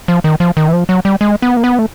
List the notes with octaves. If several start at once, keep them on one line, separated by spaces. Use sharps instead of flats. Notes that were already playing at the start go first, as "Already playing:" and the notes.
F3
D#3
F3
D#3
E3
F3
F#3
G3
G#3
B3
A#3
B3
A3